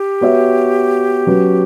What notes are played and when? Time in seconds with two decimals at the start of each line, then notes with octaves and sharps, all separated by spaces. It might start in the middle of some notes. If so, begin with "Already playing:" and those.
Already playing: G4
0.21 B3 F#4 C#5 E5
1.27 F#3 C#4 F#4 B4